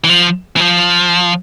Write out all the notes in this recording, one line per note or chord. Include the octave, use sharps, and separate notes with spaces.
E3
F3
E3
F3